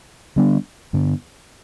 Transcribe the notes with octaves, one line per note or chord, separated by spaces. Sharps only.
D3 G3 B3 D4
G2 D3 B3 D4